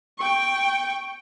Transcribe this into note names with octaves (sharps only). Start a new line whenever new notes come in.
G5 C#6